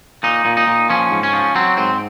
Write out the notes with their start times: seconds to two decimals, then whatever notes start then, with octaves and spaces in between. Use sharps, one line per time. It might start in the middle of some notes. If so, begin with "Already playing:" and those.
0.23 A#2 D#4
0.45 A#2
0.57 D#4
0.67 A#2
0.90 F3 C#4
1.11 G#2
1.23 C#4
1.33 F3
1.55 F#3 C4
1.77 G#2 C4